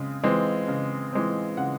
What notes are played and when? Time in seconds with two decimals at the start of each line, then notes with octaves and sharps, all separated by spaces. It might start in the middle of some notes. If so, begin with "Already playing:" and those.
Already playing: C#3 G#3 C4
0.24 E3 G#3 C4
0.68 C#3
1.13 E3 G#3 C4
1.57 C#3 F#5